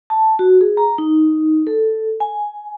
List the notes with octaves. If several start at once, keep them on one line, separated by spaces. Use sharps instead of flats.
A5
F#4
G#4
A#5
D#4
A4
G#5